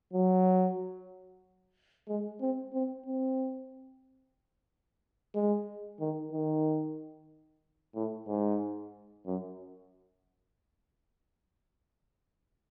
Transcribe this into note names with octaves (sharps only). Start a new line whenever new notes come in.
F#3
G#3
C4
C4
C4
G#3
D#3
D#3
A2
G#2
F#2